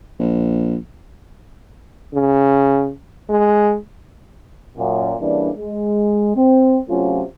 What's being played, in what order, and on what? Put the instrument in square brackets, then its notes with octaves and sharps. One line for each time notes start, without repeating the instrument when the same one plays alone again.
[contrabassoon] A#1
[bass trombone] C#3
G#3
[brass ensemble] F#2 A#2
C#3 E3 G3 A#3 D4
G#3
C4
C3 F#3 A3 C#4 F4